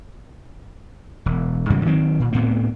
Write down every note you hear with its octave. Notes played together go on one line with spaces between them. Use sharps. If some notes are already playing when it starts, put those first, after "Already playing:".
E1
G#2 C#3 E3 G3
D#3 F#3 C4
A#2
D2 A2 B3 C4